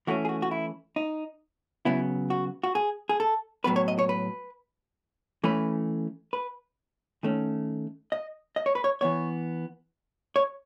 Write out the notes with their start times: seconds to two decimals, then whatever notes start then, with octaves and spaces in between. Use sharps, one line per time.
0.07 E3 A3 C#4 F#4
0.25 G#4
0.29 F#4
0.42 F#4
0.51 E4
0.96 D#4
1.85 C#3 F#3 B3 E4
2.30 F#4
2.64 F#4
2.75 G#4
3.09 G#4
3.20 A4
3.64 A2 F#3 B3 B4
3.76 C#5
3.88 D#5
3.99 C#5
4.09 B4
5.44 E3 A3 C#4 B4
6.33 B4
7.23 D#3 A3 C#4
8.12 D#5
8.56 D#5
8.66 C#5
8.75 B4
8.84 C#5
9.01 E3 B3 C#5
10.36 C#5